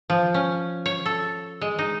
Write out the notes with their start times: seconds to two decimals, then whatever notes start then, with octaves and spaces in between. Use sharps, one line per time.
0.10 F3
0.34 C#4
0.86 C#5
1.06 A4
1.61 G#3
1.79 D#4